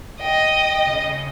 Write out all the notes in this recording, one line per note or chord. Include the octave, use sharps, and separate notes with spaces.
D#5 G5
C#3